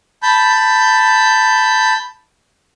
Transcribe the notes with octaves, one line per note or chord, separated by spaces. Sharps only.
A5 B5 G6